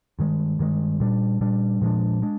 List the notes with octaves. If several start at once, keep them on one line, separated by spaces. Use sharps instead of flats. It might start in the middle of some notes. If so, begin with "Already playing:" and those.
G2 D#3 G#3
G2 D#3 G#3
A#2 G3 D4
A#2 G3 D4
A#2 F3 G#3 D4
G#3 D4